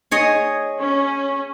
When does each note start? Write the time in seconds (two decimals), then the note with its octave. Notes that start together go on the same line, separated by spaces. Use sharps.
0.11 G#4 C#5 D#5
0.80 C#4